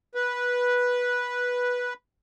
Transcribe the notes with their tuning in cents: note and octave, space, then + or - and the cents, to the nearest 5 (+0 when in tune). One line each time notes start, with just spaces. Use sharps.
B4 -10